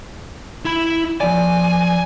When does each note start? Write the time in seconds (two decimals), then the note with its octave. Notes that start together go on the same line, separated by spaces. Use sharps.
0.65 E4 B5
1.20 F3 D5 G#5